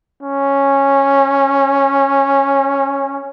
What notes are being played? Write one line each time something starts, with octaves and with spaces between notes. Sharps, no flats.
C#4